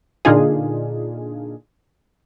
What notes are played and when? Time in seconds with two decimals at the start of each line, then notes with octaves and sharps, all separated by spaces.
0.25 A#2 D3 D4 D#4 F4 G#4